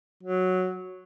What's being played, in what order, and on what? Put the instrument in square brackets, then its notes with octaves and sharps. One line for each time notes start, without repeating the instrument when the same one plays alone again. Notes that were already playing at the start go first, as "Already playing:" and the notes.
[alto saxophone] F#3